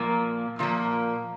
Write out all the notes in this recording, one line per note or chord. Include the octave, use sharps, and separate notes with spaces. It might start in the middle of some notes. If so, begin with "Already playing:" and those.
Already playing: A#2 F3 A#3
A#2 F3 A#3